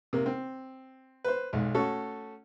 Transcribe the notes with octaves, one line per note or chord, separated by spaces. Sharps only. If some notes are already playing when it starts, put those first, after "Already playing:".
C3 A#3
C4
B4 C5
B1 G#2
A3 C#4 F#4 A4